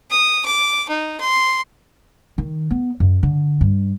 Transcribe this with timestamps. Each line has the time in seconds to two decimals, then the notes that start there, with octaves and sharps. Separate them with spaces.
0.11 D#6
0.46 D6
0.89 D#4
1.20 C6
2.38 D#3
2.70 B3
3.00 F#2
3.23 D3
3.61 G2